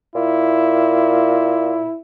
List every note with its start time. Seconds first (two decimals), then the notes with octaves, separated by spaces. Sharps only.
0.15 A#2 E4